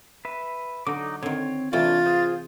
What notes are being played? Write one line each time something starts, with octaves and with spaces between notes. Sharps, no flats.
B4 E5
D3 F#3 D#4 D6
D3 D#3 C4 C#5
C3 E3 A3 D4 F4 C#5 D5 A6
G#4 C5